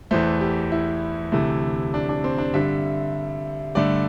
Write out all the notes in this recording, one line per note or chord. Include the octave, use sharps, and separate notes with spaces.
E2 E3 A3 C5
G4
E4
D2 C3 E3 A3
D4
D4
C4
D4
G2 D3 G3 E5
G2 D3 A3 D5